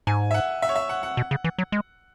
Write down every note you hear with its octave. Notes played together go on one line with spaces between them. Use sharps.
G#2 G#5
E5
F#5
E5
C#5
E5
F#5
F#5
B2
C#3
E3
F#3
G#3